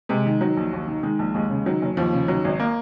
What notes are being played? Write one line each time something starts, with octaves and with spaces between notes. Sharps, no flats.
C3 G#3
D#3
D#3 F#3
A#1
D#2
D#3
D#3 G#3
A#1
D#2 G#3
C#3
D#3 F#3
F#1
D#2 F3
C#3
D#3 F#3
G#1
A#3